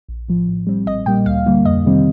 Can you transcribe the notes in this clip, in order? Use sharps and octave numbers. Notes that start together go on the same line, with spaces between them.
A#1
A2 F3
A2
G3 C4
A#1 D#5
A#2 G3 A#3 G5
D2 F5
D3 G3 A#3
F2 D#5
C3 D#3 G3 C4